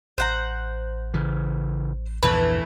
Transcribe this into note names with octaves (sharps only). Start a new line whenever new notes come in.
A1 C5 F#5 A#5
C#3 E3
A#1 E2 G2 E3 A3 E4 B4